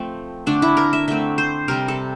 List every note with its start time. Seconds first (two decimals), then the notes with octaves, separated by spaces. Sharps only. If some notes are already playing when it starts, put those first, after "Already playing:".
Already playing: F3 A3 C4
0.46 D3 A3 C4 D4
0.62 E4
0.77 A#4
0.93 E5
1.08 D3 A3 C4 E5
1.38 C5
1.68 C3 G3 C4 A#4
1.88 A4